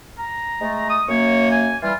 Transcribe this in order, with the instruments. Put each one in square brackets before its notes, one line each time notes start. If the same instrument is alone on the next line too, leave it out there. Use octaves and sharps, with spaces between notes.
[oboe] A#5
[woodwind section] G#3 A3
[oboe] D#6
[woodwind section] F#2 A#3 [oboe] C#5
[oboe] G#5
[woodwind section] E3 G3 [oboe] F4